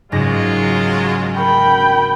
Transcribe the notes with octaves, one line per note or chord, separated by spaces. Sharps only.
F#1 G#2 F#3 G#3 F4 A#6
F#4 A#4 G5 B5